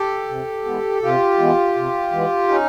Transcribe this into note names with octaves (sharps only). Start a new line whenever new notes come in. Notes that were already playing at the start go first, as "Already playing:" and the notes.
Already playing: G4 A4
C3
E3 G#3 B3
C3 F4 G4
E3 G#3 B3
C3
E3 G#3 B3
C#4 D#4